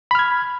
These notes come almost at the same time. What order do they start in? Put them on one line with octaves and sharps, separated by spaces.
B5 F6 G#6